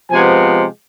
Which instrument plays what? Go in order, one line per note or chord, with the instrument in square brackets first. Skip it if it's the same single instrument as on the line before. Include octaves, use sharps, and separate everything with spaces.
[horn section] C3 F3 G#3 B3 G#5